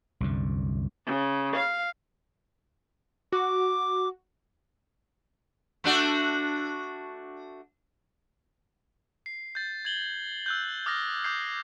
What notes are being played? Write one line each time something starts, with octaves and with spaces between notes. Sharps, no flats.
C2 F#2 D3
C#3
F5
F#4 D6
A3 D4 F#4
C7
G6 A6
G#6 F#7 G7
E6 F#6 G6
D6 D#6 F6 G6 A6 A#6
D6 D#6 F6 G6 C7